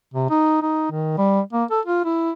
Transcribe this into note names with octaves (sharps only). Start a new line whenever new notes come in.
C3
D#4
D#4
D#3
G3
A#3
A4
F4
E4